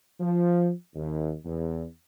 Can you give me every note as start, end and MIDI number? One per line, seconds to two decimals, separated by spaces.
0.20 0.70 53
0.94 1.33 39
1.45 1.85 40